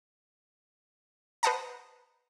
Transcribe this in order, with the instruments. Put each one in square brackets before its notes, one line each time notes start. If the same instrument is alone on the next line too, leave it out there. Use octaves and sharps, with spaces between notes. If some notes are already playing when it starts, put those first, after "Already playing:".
[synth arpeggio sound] B4 C5 D#5 F#5 A5 A#5